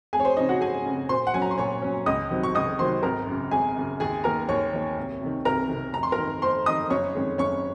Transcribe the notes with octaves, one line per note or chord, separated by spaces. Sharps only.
F1 G#4 G#5
C#5
C5
F2 C#3 D#4 D#5
F#4 F#5
F1 G#4 G#5
F2 C#3
A#2 C5 C6
F#5
F#3 C#4 G#5
A#5
C6
A#2 C#5 C#6
F#3 C#4
C#2 D#5 D#6
C3 D#3 F#3 C4
C#6
C#2 D#5 D#6
C3 D#3 F#3 C4 C5 C6
G#1 A#4 A#5
F#2 C#3
G#1 G#4 G#5
F#2 C#3
D#2 G#4 G#5
D#3 A#3 A#4 A#5
D#2 C#5 C#6
D#3 A#3
C2
C3 D#3
C2 A#4 A#5
C3 D#3
F1 A#5
C6
A#4 A#5
F2 D#3
F1 C5 C6
F2 D#3 D#5 D#6
F#1 C#5 C#6
F2 D#3 G#3 C#4
F#1 C#5 C#6